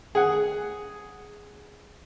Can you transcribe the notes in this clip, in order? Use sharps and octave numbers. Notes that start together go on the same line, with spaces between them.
G#4 F#5